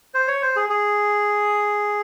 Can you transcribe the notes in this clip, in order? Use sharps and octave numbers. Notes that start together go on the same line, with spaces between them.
C5
C#5
C5
G#4
G#4